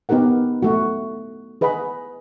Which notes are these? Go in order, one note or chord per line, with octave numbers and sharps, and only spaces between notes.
B3 D#4 G4 A#4 F#5
A3 F#4
G#4 B4 D#5 F#5 B5